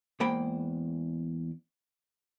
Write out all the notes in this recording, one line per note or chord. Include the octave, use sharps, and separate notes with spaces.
E2 G#3 A#3 C5 G5 B5